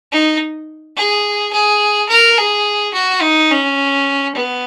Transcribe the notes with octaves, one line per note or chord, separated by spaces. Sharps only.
D#4
G#4
G#4
A#4
G#4
F#4
D#4
C#4
B3